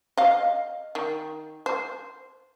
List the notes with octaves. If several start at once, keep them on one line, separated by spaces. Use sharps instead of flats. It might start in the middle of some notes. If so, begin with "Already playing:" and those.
D#5 F5
D#3
C5